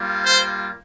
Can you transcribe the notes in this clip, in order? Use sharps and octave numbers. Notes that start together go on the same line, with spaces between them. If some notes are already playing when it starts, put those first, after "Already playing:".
Already playing: G3 A#3 F4
C5